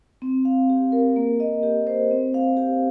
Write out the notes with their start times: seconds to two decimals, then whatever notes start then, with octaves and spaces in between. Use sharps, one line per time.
0.22 C4
0.45 F5
0.70 G4
0.92 A#4
1.16 A#3
1.40 D#5
1.63 G4
1.87 C5
2.11 C4
2.34 F5
2.57 G4